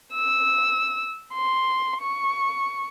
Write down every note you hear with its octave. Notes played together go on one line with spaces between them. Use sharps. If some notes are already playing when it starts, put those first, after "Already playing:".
E6
C6
C#6